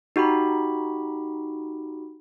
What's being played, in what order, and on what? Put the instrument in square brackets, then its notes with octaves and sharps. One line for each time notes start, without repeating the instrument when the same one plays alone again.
[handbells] D#4 F#4 G4 B5